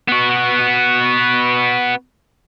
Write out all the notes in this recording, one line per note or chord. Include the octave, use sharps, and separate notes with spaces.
B3 F#4